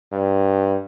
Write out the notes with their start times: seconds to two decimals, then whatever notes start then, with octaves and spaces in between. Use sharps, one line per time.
0.12 G2